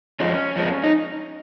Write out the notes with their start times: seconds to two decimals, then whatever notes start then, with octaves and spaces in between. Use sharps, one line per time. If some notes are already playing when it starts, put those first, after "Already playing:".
0.20 F2 F3 G#3 C#4
0.56 F2 F3 G#3
0.84 D#4